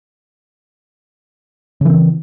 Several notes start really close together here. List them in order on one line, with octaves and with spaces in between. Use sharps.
C#3 E3 C4